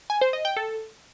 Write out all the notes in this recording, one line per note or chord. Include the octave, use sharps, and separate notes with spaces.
G#5
C5
D#5
G5
A4